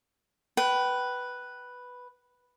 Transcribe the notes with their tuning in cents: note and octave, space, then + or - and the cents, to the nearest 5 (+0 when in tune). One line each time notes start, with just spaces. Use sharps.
B4 +0 G5 -35